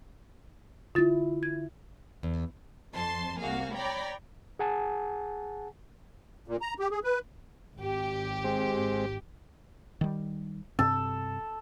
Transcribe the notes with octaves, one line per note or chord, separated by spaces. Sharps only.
D3 E4 F4 A6
G#6
E2
F2 A5 C6
C2 A#3 F#4 G#4 F5
C#5 D5 G5 A#5 B5
G#4 F#5 G#5 A5
A#2
A#5
G4
G#4
B4
G#1 G4
G#3 C4
D#3 G3
G2 C3 C4 A4